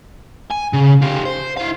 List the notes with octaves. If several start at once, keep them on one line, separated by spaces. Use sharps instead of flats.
G#5
C#3
F4 G4
C5
E4 F5